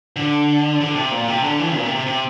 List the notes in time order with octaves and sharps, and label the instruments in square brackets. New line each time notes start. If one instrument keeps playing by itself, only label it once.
[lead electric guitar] D3
D3
C3
A#2
C3
D3
E3
A#2
C3
C3
C3